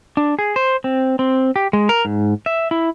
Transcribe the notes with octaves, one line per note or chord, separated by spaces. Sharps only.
D4
G#4
C5
C4
C4
G4
G#3
A#4
G#2
E5
E4